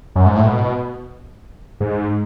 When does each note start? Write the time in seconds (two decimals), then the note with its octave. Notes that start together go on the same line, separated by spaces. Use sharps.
0.16 F#2
0.26 G#2
0.36 A2
0.46 B2
1.80 G#2